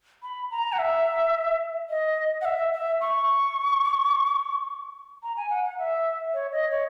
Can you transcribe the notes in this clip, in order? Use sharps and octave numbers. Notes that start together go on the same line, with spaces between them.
B5
A#5
F#5
E5
D#5
F#5
E5
E5
C#6
A#5
G#5
F#5
F#5
E5
C#5
D#5
C#5